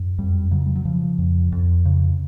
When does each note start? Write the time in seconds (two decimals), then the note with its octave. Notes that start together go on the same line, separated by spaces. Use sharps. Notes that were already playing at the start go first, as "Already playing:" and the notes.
Already playing: F#2
0.18 F2 G3
0.51 C#3 F#3
0.66 G3
0.76 F#3
0.85 C#3 F3
1.18 F2
1.52 F2
1.85 C#3